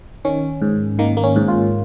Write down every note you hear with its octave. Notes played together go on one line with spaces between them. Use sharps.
D#3 C#4
G#2
D#3 A#3
A#3
C#4
G#2
F4